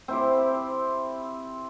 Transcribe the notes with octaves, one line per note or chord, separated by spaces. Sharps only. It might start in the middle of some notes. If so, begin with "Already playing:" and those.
C4 E4 G4